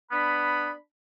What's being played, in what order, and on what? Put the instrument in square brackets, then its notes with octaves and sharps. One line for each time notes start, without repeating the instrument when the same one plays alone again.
[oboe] B3 [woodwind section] D4 B5